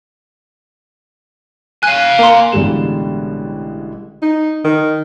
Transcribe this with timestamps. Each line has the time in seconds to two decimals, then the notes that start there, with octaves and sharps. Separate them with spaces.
1.83 F5 G#5 F#6 D#7
2.19 A#3 C6 F7
2.52 A1 B2 D3 G3 G#3 E7
4.22 D#4
4.64 D#3